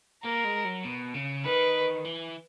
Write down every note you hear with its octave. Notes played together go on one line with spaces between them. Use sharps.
A#3 A#4
G#3
F#3
B2
C#3
D#3 B4
E3